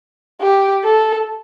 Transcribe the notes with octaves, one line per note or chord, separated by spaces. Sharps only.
G4
A4